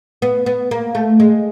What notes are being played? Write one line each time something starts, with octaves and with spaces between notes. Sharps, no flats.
B3
B3
A#3
A3
G#3